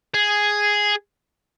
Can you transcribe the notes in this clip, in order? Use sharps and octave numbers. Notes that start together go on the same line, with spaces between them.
G#4